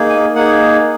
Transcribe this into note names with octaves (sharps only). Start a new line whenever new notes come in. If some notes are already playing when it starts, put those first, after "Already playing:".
Already playing: A#3 D#4 G#4
G#5
A#3 D#4 G#4 F#5